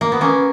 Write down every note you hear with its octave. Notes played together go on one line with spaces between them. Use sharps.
A#3
B3
A#3 C#4